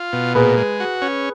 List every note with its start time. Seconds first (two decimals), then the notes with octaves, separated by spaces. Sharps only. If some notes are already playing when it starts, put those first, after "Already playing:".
Already playing: F4
0.13 B2
0.35 A#2 G#4 B4
0.57 G#3
0.80 F#4
1.02 C#4